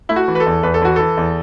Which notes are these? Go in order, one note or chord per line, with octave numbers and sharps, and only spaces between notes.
A3 E4
F#4
E3
B4
A4
E2
E2 B4
A4
E3 F#4
E3 A4
E2